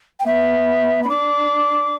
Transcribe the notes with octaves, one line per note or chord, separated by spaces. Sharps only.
G5
B3 E5
B5
D4 D6